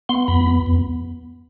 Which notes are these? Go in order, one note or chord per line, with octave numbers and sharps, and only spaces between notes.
B3 C6
F2 B5
B3
F2